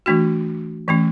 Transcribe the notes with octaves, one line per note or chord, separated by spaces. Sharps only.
E3 A3 D4 F#4
E3 A3 C#4